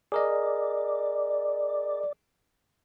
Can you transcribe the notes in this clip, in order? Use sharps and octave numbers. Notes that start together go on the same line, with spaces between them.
G#4 A#4 D5 D#5